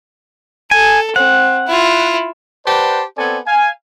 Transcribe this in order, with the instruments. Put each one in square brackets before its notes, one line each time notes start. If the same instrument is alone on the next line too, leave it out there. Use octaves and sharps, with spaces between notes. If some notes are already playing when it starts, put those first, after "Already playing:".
[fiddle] A4 [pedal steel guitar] G#5
[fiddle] C4 [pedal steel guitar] F#5
[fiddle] E4 F4
[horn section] G4 B4 C5 D5 F#5 A5
B3 C4 A4 D5 G#5
F5 G#5